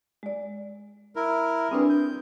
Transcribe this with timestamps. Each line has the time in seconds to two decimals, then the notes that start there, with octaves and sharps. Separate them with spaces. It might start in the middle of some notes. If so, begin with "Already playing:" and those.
0.23 G#3 D5
1.16 E4 A#4
1.71 G3 C4 D4 G#4 B4
1.89 G6